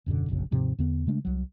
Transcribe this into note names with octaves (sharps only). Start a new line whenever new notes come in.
D#1 F#2 B2 D3
F1 A#1 F#2 C#3
D#2 G#2 C3 F3
E2 D3 B3
C#3 G#3 A3 D4
C2 F#3